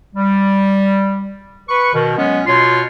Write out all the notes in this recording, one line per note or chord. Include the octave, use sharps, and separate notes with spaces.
G3
B4 C#6
B2 D#3
F#3 G#3 B3 C#4
B2 F4 C#5 C6